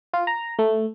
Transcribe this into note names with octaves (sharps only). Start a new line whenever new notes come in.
F4
A#5
A3